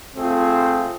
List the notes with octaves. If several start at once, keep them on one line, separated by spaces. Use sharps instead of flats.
A3 C4 F4 G#4